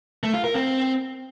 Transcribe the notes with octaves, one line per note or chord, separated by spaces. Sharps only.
A3
F4
A#4
C4